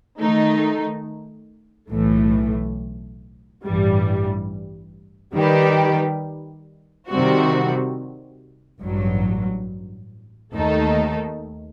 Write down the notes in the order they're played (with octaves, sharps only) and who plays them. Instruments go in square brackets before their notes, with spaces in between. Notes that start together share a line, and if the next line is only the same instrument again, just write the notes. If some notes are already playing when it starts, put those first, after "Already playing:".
[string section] D#3 A3 D#4
B1 A2 E3 A3
A1 G2 E3 G3
D#3 G3 D#4 G4 B4
C3 D#3 G3 C4 F#4
A1 G2 F#3
D#2 D#3 A3 D#4 A4